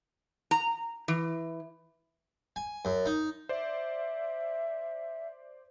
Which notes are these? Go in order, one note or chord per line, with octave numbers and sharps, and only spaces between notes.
A#5
E3
G#5
F#2
D#4
C5 D5 E5